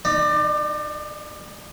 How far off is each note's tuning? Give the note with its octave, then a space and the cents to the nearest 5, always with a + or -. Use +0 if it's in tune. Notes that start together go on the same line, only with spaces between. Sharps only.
D#4 -20 D5 +25